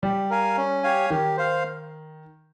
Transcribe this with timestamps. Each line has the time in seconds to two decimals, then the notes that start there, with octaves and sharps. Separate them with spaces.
0.03 G3 G4
0.30 A#4 F5 G#5
0.57 C#4
0.83 G4 C#5 F5 G#5
1.10 D#3 G4
1.37 C5 F5